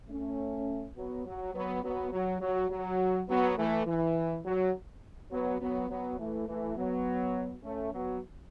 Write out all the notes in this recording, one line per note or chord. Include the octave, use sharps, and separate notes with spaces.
A3 C#4
F#3 B3
F#3
F#3 B3
F#3 B3
F#3
F#3
F#3
F#3 B3
E3 A3
E3
F#3
F#3 B3
F#3 B3
F#3 B3
E3 A3
E3 A3
F#3 B3
A3 C#4
F#3 B3